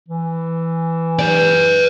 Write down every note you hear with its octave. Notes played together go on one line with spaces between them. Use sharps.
E3
B4 D5